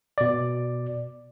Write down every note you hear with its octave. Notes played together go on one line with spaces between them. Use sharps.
B2 D5